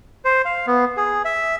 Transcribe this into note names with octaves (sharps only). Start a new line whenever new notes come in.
C5
F5
B3
G#4
E5